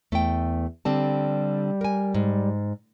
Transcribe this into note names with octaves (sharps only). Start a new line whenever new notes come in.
E2 A3 G5
D3 G3 C4 A5
A#4 G#5
G#2